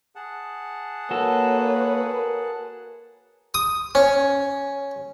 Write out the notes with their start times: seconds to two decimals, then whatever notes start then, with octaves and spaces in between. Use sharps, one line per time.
0.16 G#4 F#5 A5
1.11 A#3 F#4 A4 B4 C#5
2.06 A#4
3.54 D#6
3.95 C#4